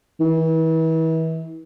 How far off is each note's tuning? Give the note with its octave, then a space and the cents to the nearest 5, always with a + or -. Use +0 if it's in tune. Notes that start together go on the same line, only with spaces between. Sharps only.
E3 -35